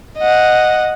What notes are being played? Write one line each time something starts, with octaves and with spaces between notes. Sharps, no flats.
D#5 F#5